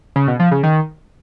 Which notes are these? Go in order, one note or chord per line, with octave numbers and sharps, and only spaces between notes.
C#3
B2
F3
C#3
D#3